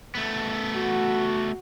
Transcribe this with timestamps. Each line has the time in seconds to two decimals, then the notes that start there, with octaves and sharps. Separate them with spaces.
0.15 A3 B3
0.75 F#4